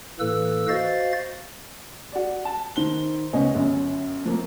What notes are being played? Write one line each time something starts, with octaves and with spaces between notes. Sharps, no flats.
A2 E3 A#3 A4 B4 E6
F#4 C5 D#5 F5 A6
F#4 D5
A5
D#3 C5 G7
C#2 B3 C#4 D#5 G#5
G1 F#2
F3 A#3 C4